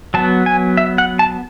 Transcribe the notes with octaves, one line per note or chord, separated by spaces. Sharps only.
F#3 B3 A5
G#5
E5
F#5
A5